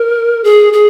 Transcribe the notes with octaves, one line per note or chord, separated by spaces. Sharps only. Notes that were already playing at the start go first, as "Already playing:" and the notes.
Already playing: A#4
G#4
G#4